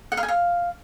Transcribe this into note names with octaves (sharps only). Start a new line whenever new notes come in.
F#5
F5
G#5
F5